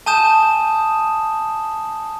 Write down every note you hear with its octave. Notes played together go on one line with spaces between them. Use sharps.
G#5 A5 D#6 G6 E7